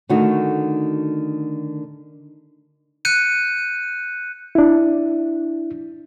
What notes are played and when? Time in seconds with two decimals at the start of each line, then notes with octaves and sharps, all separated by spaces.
0.09 D3 D#3 A3 D#4 F#4
3.05 F#6 G6 C#7 D#7
4.55 D4 E4